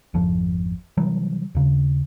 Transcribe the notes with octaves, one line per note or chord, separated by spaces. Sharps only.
G#1 F2 F3
C3 E3 F#3 G3
D#2 C#3